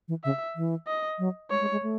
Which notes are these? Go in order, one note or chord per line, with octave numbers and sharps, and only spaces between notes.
E3
C#3 E5
E3
D#5
F#3
G#3 C#5
G#3
G#3
A3